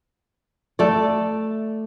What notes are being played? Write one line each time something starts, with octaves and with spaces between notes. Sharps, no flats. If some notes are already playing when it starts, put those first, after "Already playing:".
A3 D5